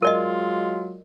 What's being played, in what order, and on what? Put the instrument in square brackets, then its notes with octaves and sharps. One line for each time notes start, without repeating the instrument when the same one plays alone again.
[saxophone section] F#3 G#3 F4 [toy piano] A#4 D5 D#5